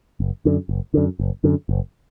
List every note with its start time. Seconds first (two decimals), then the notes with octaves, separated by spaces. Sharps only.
0.20 F#1
0.45 F#2 D3
0.69 F#1
0.94 F#2 D3
1.19 F#1
1.44 F#2 D3
1.69 F#1